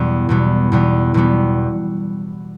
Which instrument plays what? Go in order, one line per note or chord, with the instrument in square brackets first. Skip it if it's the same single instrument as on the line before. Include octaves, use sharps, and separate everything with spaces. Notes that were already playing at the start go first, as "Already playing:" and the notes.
Already playing: [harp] E2 B2 G3 B3
E2 B2 G3 B3
E2 B2 G3 B3
E2 B2 G3 B3